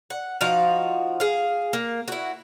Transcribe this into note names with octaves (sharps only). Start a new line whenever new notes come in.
F#5
F3 D#4 F#4 F5
G#4 F5
A#3
E4 F#4